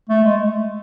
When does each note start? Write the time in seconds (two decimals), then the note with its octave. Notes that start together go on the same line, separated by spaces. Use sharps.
0.09 A3
0.24 G#3